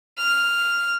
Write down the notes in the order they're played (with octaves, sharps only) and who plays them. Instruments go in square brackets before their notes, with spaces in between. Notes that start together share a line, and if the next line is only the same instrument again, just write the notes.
[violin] F6